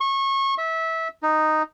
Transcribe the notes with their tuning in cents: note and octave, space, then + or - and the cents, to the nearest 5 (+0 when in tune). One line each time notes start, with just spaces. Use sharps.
C#6 -25
E5 -20
D#4 -5